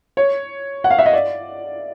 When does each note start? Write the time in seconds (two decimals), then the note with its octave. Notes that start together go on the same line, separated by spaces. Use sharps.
0.17 C#5
0.84 F#5
0.90 F5
0.99 E5
1.06 D#5
1.13 D5